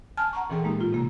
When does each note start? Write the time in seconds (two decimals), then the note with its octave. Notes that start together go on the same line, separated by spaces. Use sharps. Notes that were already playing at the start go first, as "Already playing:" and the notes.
0.17 G#5 A5 F6
0.33 F#5 A#5 C#6
0.50 A#2 E3 C4 G#4 A4 G5
0.64 G#3 A#3 D#4 G4
0.79 A2 F4
0.93 C3 A#3 A#5